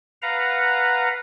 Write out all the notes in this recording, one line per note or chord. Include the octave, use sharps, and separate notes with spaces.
B4 F5 F#5 A#5